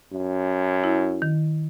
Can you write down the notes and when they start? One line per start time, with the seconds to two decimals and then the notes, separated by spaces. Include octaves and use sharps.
0.12 F#2
0.84 E4
1.22 D#3